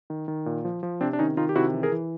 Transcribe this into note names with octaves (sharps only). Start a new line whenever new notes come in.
D#3
D#3
A#2
F3
F3
C3 C4 D4
D4
D#3 C#4 D#4
D#3 D#4 F4
G4
C3 E4 F#4
E3
G#4 A#4
E3